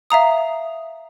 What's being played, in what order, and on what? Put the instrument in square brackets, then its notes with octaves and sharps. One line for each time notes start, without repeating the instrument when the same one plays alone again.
[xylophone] E5 F5 A#5 D#6